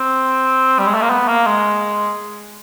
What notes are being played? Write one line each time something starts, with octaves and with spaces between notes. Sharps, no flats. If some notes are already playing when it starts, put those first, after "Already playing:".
Already playing: C4
G3
G#3
A3
A#3
B3
A#3
G#3